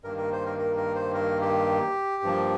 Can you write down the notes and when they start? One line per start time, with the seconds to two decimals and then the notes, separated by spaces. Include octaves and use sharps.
0.04 G2 D#3 A#3 A#4
0.18 A#4
0.32 C5
0.46 A#4
0.58 A#4
0.77 A#4
0.95 C5
1.14 A#4
1.41 G4
2.23 G2 F3 A#3